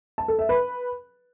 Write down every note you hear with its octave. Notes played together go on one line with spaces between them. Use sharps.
A5
A4
E5
B4